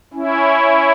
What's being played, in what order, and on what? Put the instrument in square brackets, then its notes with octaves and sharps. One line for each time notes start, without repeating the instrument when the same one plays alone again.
[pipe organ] C#4 E4